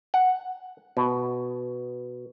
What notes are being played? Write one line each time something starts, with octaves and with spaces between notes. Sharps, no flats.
F#5
B2